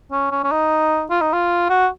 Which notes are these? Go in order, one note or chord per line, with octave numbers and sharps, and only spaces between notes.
C#4
C#4
C#4
D#4
F4
D#4
F4
F#4